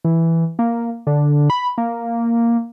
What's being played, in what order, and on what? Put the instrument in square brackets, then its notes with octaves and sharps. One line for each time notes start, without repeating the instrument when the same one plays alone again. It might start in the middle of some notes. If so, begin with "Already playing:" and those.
[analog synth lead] E3
A#3
D3
B5
A#3